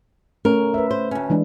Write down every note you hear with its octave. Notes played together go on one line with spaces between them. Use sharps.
A3 C#4 A#4 C#5
B4 E5
C5
D2 C#4
E3 G#3 D4